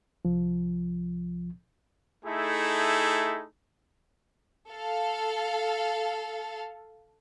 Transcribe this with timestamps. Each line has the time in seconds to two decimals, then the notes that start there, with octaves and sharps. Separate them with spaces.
0.25 C2 F3
2.25 A3 D#4 E4 G#4 A4
4.72 A4 F5